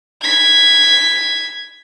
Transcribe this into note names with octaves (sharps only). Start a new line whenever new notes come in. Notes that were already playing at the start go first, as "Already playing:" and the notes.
G#6 B6